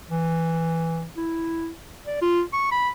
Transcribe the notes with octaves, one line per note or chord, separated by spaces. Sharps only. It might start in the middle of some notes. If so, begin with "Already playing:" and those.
E3
E4
D5
F4
C#6
B5